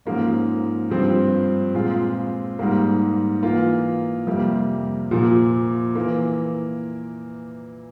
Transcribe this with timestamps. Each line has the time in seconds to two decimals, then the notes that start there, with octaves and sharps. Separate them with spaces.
0.06 G#2 F3 A#3 C#4
0.90 G2 F3 C4
1.74 A#2 G#3 C4 F4
2.59 G#2 G3 A#3
3.43 E3 A#3 F4
4.27 F2 C3 G3 A#3
5.11 A#2 F3 A#3
5.95 E3 A#3